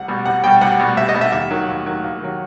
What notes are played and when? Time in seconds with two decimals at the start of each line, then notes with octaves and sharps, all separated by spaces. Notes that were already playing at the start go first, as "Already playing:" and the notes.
Already playing: C2 F#5
0.08 B2 G3
0.25 C2 F#5
0.44 B2 G5
0.47 G3
0.61 C2 F#5
0.79 B2 G3
0.97 C2 E5
1.09 D#5
1.15 B2 G3
1.21 E5
1.32 D#2 E5
1.51 D#3 F#3
1.69 D#2
1.86 D#3 F#3
2.04 D#2
2.22 D#3 F#3